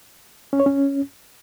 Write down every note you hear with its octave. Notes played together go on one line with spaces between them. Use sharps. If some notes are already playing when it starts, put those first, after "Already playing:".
C#4
C#5
C#4